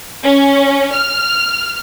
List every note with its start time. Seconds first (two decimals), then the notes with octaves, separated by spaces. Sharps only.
0.23 C#4
0.93 F6